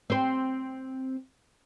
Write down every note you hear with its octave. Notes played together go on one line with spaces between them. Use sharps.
C4 C5